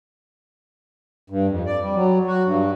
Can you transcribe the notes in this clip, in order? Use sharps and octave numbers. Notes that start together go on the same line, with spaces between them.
G2
F2
D5
G3
F#3
F#4
G2